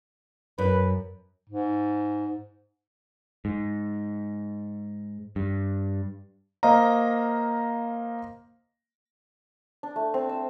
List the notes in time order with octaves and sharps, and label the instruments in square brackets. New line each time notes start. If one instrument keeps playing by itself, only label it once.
[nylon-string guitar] F#2 [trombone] B4
[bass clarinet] G#2
[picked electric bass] G#2
G2
[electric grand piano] A#3 C5 D#5 F5 A#5
[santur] D4
A3
C4
E6